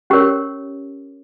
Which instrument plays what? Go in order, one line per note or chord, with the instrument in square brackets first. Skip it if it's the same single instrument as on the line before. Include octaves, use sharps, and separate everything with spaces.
[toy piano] C#4 G4 A#4 C#5